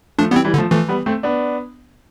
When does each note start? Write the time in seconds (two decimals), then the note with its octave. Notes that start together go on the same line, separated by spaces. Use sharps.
0.19 F3 A3 D4
0.31 E3 G3 B3
0.36 C4
0.45 E3 G3
0.54 D3
0.57 F3 A3
0.71 E3 F3 A3
0.88 G3 B3
1.06 A3 C4
1.23 B3 D4